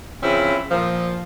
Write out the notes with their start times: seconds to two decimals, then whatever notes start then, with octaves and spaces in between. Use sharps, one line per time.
0.23 C#3 E3 F3 C4 C#4 E4
0.71 A#2 F3